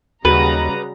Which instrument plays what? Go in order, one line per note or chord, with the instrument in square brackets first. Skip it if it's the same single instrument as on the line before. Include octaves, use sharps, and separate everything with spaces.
[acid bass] D#2 [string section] C#3 G3 A#5 [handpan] F#4 G#4 [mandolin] B4